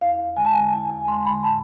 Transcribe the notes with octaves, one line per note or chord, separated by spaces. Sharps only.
E2 F5
D3 G#3 G#5
A5
G#5
E2 G#5
G#5
D3 G#3 C6
B5
A2 A5